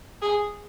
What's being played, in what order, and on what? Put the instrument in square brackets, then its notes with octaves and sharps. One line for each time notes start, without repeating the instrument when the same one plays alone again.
[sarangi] G#4